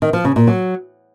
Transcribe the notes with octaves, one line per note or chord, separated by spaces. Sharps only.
D#3
F3
C#3
A#2
F#3